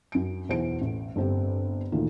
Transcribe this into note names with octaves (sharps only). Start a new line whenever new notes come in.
F#2 D7
B1 E2 B2 E3 C5 D7
A1
G1 C4 G4
D2 A#2 D#3 E3